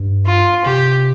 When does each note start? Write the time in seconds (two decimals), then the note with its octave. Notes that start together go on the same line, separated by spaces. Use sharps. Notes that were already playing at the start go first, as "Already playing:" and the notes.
Already playing: G2
0.26 F4
0.65 C3 G4